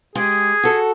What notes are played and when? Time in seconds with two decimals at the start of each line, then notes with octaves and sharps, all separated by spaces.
0.15 G#3 G4 G#4
0.63 F#4 A4